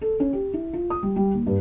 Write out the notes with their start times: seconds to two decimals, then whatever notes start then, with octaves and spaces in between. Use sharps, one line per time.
0.01 A4
0.20 C#4
0.33 G4
0.54 E4
0.73 F4
0.90 D#6
1.03 G3
1.16 G3
1.34 D#2
1.47 G2